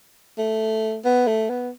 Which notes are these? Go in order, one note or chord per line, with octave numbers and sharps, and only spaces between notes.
A3
B3
A3
B3